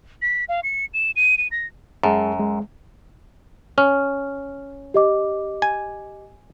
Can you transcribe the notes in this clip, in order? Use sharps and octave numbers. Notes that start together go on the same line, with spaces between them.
B6
F5
C#7
E7
D#7
D#7
A#6
F#2 G#3 G#4 A5
G#3
C#4 F6
G4 D#5 D6
G#5